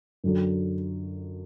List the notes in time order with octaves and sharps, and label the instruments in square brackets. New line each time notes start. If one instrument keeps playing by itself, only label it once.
[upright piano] F#2 D3 F#3